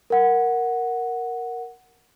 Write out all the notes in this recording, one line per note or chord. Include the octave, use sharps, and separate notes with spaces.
A#4 F#5